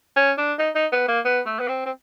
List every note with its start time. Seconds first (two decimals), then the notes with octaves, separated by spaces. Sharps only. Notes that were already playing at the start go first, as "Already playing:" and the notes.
0.16 C#4
0.38 D4
0.59 D#4
0.75 D#4
0.92 B3
1.08 A#3
1.25 B3
1.46 A3
1.59 B3
1.68 C4
1.86 C4